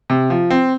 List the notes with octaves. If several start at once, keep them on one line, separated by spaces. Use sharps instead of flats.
C3
F3
C4